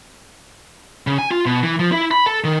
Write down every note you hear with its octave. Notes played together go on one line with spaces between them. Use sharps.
C#3
G#5
F4
B2
E3
F3
E4
B5
A4
D#3